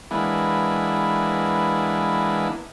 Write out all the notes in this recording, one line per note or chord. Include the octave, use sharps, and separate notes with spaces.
E3 G#3 A#3 B3 D4 E4